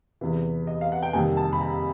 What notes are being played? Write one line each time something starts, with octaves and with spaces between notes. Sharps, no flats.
E2 C3 E3
D#5
F5
F#5
G5
F2 C3 D#3 G3 A#3 G#5
A5
B5
A#5